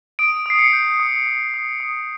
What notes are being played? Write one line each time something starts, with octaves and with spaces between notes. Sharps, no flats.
D#6 D7
D#6 C7
C#7
G6
D#6
D#6
D#6
D#6